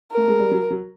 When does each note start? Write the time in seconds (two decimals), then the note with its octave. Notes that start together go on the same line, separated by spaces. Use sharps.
0.12 A3 A#4
0.28 G#3
0.39 G3
0.51 F#3
0.70 F#3